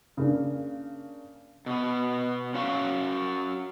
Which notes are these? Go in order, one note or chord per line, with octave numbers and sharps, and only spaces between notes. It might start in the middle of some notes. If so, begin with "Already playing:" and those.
C#3 A#3 D4
B2 B3
C#4 F#4 F5